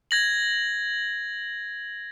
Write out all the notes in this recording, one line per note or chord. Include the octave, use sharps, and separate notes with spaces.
G#6 A#6 F#7